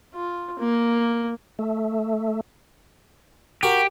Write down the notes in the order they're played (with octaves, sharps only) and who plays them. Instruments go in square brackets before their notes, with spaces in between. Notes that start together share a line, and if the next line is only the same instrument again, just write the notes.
[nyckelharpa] F4
A#3
[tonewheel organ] A3
[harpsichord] F#4 A#4 [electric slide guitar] G4